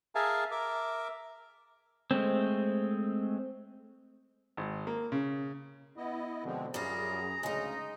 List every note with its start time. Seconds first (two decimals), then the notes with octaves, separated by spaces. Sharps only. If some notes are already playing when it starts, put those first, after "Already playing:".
0.15 G#4 A#4 E5 F5 G#5 A5
0.51 A#4 E5 D6
2.11 G#3 A3 C4
4.57 G#1
4.87 A#3
5.12 C#3
5.97 B3 E4 D#5
6.45 B2 D3 F3 G#3 C4
6.74 F#2 G3 F4 G#4 A#5
7.43 D2 C#3 G#3 D#4